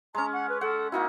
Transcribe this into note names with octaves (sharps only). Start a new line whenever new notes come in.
G#3 C#4 A#5
F#5
B4
A4 F#5
A#3 D#4 E4 F#4